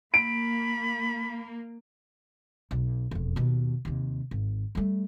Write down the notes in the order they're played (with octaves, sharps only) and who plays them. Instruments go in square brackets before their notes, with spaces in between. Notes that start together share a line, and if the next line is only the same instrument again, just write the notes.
[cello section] A#3 [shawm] B5 [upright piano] D7
[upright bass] B1
E1 F2
D#2 B2
D#2 C3
G#1
G3 A3